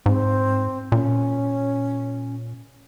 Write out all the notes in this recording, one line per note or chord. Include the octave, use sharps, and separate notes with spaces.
G#2 C4
A#2 C#4